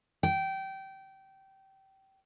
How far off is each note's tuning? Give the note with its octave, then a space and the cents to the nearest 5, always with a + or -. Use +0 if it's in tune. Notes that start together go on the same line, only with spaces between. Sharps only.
G5 -20